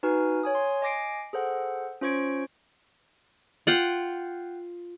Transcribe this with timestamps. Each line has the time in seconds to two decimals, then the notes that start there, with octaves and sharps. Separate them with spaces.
0.03 D#4 F#4 B4 G#5 F6
0.43 C#5 G#5 D#6
0.55 C6
0.82 D#5 G#5 D6 A#6 C7 D7
1.33 G#4 A4 C5 F#5
2.01 C#4 F4 C5 C#6 G#6 D7
3.67 F4 F#5 G5